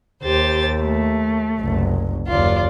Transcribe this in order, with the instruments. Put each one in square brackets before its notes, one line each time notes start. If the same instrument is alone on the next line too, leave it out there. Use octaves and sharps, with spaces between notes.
[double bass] D#2 [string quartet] G4 C5 A6
[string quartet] A3
[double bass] F#1 C2
[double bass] F#1 D#2 [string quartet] F4 D5